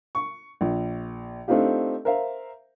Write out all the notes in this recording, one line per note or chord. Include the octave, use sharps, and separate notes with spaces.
C#6
A#1
A3 C4 D4 D#4 F4 G4
A#4 C5 E5 F5